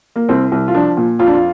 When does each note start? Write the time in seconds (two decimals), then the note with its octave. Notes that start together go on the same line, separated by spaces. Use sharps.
0.16 A#3
0.29 C2 C4
0.52 C2
0.68 F4
0.74 F3 D4
0.97 A#2
1.19 F2 F4
1.27 D4
1.34 F4